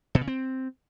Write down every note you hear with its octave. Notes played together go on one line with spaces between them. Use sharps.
B2
C#3
C4